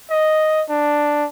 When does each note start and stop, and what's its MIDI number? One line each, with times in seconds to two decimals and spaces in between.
0.10 0.63 75
0.69 1.26 62